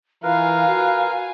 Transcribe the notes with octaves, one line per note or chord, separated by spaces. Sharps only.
E3 F4 A#4 B4 F5 G#5
F#4